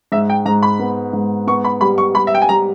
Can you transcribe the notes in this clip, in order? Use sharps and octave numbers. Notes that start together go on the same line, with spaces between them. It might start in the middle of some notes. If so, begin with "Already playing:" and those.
G#2 E5
G5
G#2 A#5
B5
B3
G#2
B3 C#6
B5
G3 B5
C#6
G3 B5
E5
G5
G#5
G3 A#5